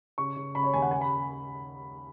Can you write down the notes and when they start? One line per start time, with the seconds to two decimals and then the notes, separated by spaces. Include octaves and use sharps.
0.18 C#3 C#6
0.36 C#3
0.55 C#3 B5
0.64 C#5
0.74 D#2 G#5
0.82 F#5
0.91 C#3 G#5
1.01 B5